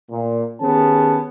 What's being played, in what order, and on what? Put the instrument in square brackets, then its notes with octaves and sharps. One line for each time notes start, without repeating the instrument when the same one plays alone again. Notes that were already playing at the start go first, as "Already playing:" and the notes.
[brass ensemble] A#2
D#3 B3 C#4 G4 G#4 A5